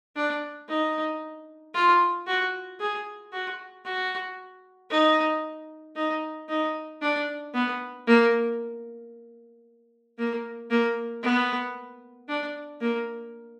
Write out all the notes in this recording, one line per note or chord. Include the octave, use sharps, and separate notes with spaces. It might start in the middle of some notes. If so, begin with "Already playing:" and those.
D4
D#4
F4
F#4
G#4
F#4
F#4
D#4
D#4
D#4
D4
B3
A#3
A#3
A#3
B3
D4
A#3